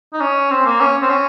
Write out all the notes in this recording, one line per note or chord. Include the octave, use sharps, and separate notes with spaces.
D#4
C#4
C4
A#3
C#4
C4
C#4